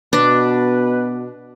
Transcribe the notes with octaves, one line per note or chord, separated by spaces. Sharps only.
B2 D4 B4